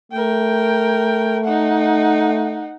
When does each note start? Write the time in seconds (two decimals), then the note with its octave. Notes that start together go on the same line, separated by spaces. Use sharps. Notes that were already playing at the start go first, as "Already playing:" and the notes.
0.12 A3 A#4 G5
1.44 D#4 F#5